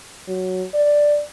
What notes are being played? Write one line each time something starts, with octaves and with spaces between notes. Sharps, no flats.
F#3
D5